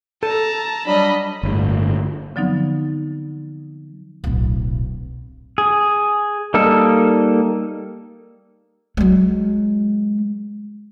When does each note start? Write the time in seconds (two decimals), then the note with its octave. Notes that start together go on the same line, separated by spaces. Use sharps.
0.23 A4 A5 A#5
0.86 F#3 G3 D4 D#5 B5
1.43 G1 A2
2.36 D3 F3 F#3 B3 C4 D#4
4.24 D1 B1
5.58 G#4
6.54 G3 A#3 D#4 A4
8.97 F#3 G#3